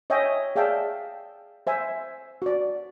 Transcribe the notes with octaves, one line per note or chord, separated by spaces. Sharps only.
C#5 D#5 E5 G5 G#5
G#4 D5 E5 F5 G5 A5
C5 E5 G#5
F#4 D5